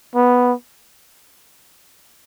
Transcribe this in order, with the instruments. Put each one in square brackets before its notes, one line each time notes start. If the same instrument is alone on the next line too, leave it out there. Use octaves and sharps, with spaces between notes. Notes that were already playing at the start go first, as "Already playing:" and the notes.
[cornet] B3